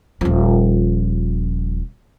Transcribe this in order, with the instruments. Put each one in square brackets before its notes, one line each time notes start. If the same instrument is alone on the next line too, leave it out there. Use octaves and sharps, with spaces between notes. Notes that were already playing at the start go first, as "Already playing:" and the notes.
[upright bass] D#1 F3